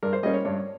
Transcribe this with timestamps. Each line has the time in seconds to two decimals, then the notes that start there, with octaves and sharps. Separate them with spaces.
0.03 G2 A#4
0.13 C5
0.23 G3 A#3 C#4 D#5
0.34 C#5
0.45 G2 C#5